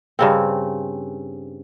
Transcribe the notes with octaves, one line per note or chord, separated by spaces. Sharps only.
G2 C#3 C4